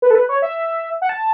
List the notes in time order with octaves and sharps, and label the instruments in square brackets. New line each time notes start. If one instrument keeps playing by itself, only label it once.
[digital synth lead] B4
A4
B4
C#5
E5
F#5
A5